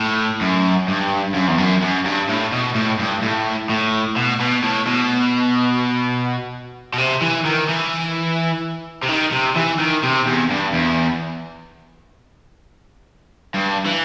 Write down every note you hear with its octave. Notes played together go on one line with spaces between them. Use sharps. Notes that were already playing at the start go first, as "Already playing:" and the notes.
Already playing: A2
F#2
G2
F#2
E2
F#2
F#2
G2
A2
B2
A2
G2
A2
A2
B2
B2
A2
B2
B2
C3
E3
D#3
E3
C3
D#3
C3
E3
D#3
C3
E2
G2
E2
G2
E3